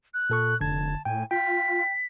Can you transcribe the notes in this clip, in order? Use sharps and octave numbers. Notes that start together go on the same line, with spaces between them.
F#6
A#2 A4 C#6
F1 D3 A5 G#6
A2 G5 G#5
F4 G5 B6